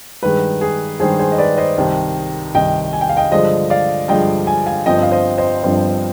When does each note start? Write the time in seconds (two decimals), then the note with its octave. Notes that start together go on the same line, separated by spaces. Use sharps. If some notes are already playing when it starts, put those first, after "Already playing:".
0.23 G2 D#3 G#3 B4
0.61 G#4
1.00 G2 D#3 G#3 G#4 C5
1.19 G#4 C5
1.32 D#5
1.38 B4 D5
1.58 C5 D#5
1.78 C2 C3 D#3
2.55 C2 C3 D#3 D#5 G5
2.93 G#5
3.01 G5
3.09 F5
3.17 D#5 G5
3.31 G2 D3 F3 G#3 C5 D#5
3.70 D5 F5
4.08 G2 D3 F3 G#3 D#5 G5
4.47 G#5
4.66 F5 G#5
4.86 G1 G2 F3 C4 D#5 G5
5.03 F5
5.11 C5 D#5
5.38 C5 D#5
5.63 G1 G2 F3 C4